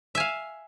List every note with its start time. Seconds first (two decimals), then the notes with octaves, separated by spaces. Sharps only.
0.15 E5
0.17 G#5
0.20 F5